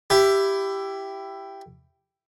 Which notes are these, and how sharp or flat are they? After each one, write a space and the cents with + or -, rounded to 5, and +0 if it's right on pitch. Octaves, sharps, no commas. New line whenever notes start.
E4 +15 G4 +0